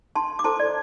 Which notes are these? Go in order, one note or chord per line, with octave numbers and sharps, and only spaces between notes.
A5 C6
D6
E4 A4 C5 A5 C6
D5